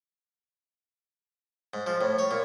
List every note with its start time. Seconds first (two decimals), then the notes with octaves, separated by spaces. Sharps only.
1.74 G#2
1.87 F3
2.01 A2
2.19 C#5
2.31 A#2